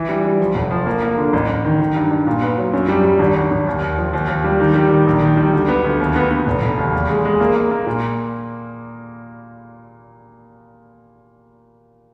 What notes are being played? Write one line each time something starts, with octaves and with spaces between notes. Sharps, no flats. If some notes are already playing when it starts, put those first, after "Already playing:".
Already playing: E3
G3
G3
F3
F1
F3
A#3
A#3
D3
A1
A1
D#3
D#3
G2
G2
A#2
B3
F#3
F#2
G3
G3
G#1
G#1
G#1
D#2
D#2
F3
D#2
D#2
G3
D#3
G3
D#3
A#1
D#3
G3
D2
B3
D2
D#2
B3
B3
F1
F1
D#2
E2
G#3
G#3
A#3
A#3
A#3
A#2